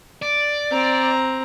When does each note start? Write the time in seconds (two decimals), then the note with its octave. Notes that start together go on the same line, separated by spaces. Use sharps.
0.22 D5
0.71 C4 A#5